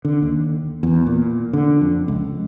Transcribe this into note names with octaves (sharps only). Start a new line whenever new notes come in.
D3
D#2
E2
A#2
D3
F2
C#2